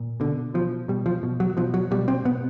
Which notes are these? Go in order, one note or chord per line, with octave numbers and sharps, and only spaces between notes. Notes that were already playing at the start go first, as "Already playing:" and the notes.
Already playing: A#2
B2 D3
B2 F3
B2 G3
F3
B2
F#3
B2 F3
F#3
B2 G3
C4
B2 B3